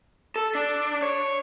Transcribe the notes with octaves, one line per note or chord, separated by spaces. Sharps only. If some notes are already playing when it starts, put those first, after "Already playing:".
A4
D4
C#5